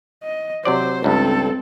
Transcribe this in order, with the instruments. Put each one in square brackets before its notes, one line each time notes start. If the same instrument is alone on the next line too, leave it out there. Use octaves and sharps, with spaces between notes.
[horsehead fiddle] D#5
[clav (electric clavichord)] C3 F#3 D5 [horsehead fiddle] C5
[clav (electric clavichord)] C#2 G2 [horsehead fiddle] C4 A4